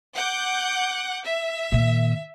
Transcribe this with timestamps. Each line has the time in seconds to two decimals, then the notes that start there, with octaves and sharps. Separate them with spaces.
0.14 F#5 D6 G6
1.25 E5
1.72 A#2 D#3